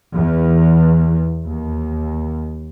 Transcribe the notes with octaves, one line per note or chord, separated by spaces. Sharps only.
E2
D#2